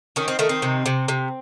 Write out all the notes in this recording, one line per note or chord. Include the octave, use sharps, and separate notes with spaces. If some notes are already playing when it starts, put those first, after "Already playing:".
D#3 C#4
C4
D#3 A3
C4
C3
C3
C3